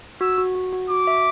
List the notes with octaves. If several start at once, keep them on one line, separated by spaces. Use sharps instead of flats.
F#4 E6
F#4
F#4
F#4
F#4 D6
E5